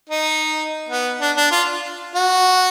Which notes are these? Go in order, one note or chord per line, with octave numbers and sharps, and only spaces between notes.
D#4
B3
D4
D4
F4
F#4